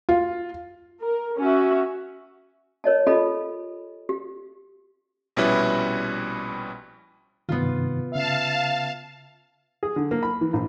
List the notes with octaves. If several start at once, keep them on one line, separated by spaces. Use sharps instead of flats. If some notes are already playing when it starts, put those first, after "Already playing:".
F4
A#4
C#4 F#4 E5
A#4 C#5 D#5 A5
F4 G4 A4 D#5 A5 B5
G4
A#1 B2 G3 C#4 E4 B4
G2 C3 D#3 B3 F4
C#3 E5 F5 A5
G#4
D3
A#3
B5
E3
A#1